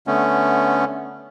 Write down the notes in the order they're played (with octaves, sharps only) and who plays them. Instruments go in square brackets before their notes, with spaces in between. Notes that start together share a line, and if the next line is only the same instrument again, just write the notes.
[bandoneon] D3 A3 B3 C#4